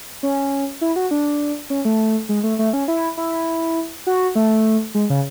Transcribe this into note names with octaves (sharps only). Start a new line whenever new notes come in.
C#4
E4
F#4
D4
C#4
A3
G#3
A3
A3
C#4
E4
E4
F#4
A3
G#3
C#3